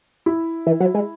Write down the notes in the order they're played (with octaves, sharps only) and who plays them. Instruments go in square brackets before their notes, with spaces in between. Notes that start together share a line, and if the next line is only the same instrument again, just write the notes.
[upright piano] E4
[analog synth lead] E3
F#3
G#3